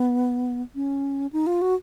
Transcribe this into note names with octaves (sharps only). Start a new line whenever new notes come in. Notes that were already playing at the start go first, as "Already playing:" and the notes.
Already playing: B3
C#4
D#4
F4
F#4